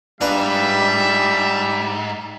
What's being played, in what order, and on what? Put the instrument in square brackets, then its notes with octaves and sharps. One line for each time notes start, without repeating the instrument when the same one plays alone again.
[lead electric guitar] G#2 [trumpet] G3 [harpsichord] D4 F4 B4 [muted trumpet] E5